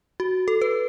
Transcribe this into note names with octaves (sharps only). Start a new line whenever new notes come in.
F#4
A4
B4